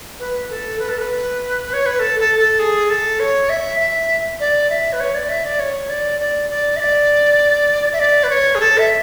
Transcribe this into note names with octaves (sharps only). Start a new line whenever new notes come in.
B4
A4
B4
A4
B4
C#5
B4
A4
A4
A4
G#4
A4
C#5
E5
E5
D5
E5
B4
C#5
D5
E5
D5
C#5
D5
D5
D5
E5
D5
E5
D5
B4
C#5
G#4
A4
E5